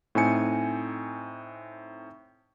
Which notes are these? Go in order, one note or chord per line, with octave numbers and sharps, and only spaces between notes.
A2 C4 D#4 G#5 C#7